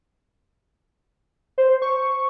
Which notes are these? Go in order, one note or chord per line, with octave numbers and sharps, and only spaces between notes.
C5
C#6